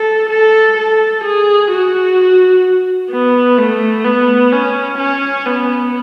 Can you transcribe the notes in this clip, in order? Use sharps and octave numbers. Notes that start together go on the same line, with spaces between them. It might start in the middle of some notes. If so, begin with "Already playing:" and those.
Already playing: A4
A4
A4
G#4
F#4
B3
A3
B3
C#4
C#4
B3